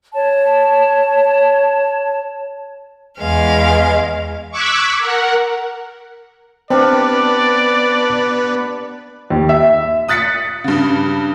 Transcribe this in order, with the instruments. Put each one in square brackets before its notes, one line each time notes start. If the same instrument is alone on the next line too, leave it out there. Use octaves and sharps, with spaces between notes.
[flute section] C#5 A5
[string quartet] E2 G#3 F5
[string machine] C#6 D6 E6 F#6 G#6 B6
A#4 F#5
[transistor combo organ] B3 [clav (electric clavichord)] C4 [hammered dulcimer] D4 G4 F5 [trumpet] D5
[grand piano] D#2
E5
[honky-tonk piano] D#6 F#6 A6 B6 C#7
G2 C#3